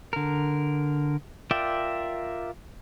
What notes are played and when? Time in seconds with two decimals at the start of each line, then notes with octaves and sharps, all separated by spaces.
0.13 D3 A#4
1.51 F4 A#4 D5 E5 G5